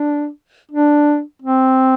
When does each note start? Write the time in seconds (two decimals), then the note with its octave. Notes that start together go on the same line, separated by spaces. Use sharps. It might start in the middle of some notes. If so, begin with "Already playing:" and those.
Already playing: D4
0.71 D4
1.42 C4